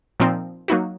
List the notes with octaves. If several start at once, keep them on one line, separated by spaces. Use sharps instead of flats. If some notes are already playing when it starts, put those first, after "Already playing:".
A#2 F3 C4 D#4
F#3 A#3 D#4 F#4